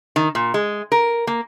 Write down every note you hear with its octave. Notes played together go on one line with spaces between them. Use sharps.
D#3
A#2
G#3
A#4
A#3